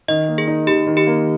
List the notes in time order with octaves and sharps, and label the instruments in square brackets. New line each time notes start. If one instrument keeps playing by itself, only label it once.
[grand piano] D#3 [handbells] D#5
[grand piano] A#3
[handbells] G#4
[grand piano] D#4
[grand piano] D#3 [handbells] G4
[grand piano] D#3
[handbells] G4
[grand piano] A#3